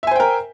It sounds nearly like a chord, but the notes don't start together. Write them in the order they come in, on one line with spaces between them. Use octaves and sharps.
E5 G#5 C5 G5 A#4